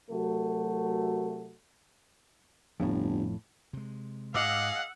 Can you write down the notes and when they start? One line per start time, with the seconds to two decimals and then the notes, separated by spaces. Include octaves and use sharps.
0.11 C3 F#3 A3 F#4 A#4
2.80 G1 F2 A2
3.73 C3 G#3
4.34 G#2 G#4 D#5 F5 F#5 D6 E6